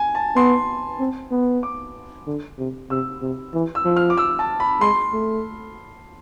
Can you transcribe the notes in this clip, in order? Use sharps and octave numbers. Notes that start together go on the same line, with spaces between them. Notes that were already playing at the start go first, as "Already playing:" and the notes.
Already playing: G#5
A5
B3 C6
C4
B3
D6
D3
C3
C3 E6
C3
E3
E6
F3
F6
D6
E6
A5
B5
G#3 C6
A3